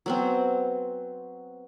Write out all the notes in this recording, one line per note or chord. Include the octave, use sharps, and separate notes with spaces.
F#3 B3 C4